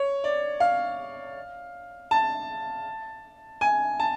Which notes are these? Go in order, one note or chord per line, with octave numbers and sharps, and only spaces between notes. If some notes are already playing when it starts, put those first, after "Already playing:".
Already playing: C#5
D5
F5
A5
G#5
A5